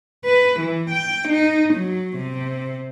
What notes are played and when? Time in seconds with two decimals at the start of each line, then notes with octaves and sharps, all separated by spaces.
0.25 B4
0.60 E3
0.91 G5
1.29 D#4
1.74 F#3
2.18 C3